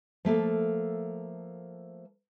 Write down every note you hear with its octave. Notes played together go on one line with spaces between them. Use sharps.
F3 A3 A#3 A4